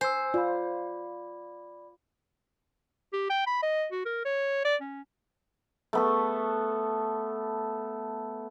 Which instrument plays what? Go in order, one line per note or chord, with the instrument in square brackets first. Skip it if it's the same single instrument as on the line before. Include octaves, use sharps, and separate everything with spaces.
[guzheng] C5 [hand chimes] G#5 E6
[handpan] F4 [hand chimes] D5 B5
[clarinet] G4
G5
B5
D#5
F#4
A#4
C#5
D5
C#4
[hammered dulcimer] A3 B3 A4